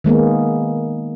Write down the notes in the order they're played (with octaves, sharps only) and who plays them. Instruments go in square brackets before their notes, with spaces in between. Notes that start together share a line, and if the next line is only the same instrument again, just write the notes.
[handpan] D#3 G#3 A#3 B3